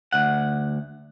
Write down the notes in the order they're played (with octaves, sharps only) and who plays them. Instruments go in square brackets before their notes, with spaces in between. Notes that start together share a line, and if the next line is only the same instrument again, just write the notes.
[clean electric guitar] D2 F#5